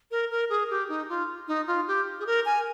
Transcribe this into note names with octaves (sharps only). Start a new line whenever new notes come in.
A#4
A#4
G#4
G4
D#4
F4
D#4
F4
G4
G#4
A#4
G#5